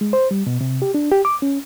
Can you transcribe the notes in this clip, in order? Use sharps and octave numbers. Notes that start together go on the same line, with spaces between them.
G#3
C5
G3
B2
C3
G4
D4
G4
D6
C#4